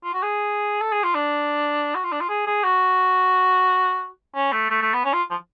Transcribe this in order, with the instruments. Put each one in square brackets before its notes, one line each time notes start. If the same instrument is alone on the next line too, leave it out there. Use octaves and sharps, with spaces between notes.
[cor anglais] F4
F#4
G#4
A4
G#4
F4
D4
F#4
F4
D4
F4
G#4
G#4
F#4
C#4
A3
A3
A3
B3
C#4
F4
F3